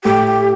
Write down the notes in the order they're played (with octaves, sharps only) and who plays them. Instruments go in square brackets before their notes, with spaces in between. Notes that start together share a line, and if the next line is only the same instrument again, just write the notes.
[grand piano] A2 [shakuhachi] G4